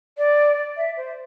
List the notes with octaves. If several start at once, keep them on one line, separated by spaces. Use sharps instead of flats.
D5
E5
C5